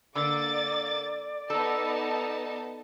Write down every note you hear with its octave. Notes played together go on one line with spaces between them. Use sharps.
D3 A#3 D5 D6 A6
B3 D#4 A4 A5